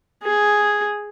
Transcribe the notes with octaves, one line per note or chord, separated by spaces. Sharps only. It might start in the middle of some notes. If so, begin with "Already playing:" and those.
G#4